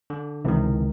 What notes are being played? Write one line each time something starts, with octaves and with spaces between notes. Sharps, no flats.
D3
C#2 C3 D#3 E3